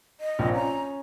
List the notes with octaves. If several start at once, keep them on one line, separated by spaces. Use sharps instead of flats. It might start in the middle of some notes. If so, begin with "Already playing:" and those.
D#5
A#1 A#2 C4
C#4 A#5